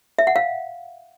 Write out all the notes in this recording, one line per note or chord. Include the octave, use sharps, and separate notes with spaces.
E5
F#5
F5